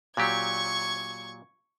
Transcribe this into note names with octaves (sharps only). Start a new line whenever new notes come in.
A#2 F#3 G4 C#6 G#6